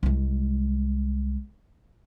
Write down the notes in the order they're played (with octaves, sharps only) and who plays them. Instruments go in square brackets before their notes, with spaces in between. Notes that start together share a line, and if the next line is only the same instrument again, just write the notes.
[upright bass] C2 G#3